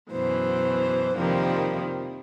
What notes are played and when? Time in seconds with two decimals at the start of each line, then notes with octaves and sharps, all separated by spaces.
0.12 F#2 B2 E3 C5
1.17 F2 C3 D#3 F3 G3 A#3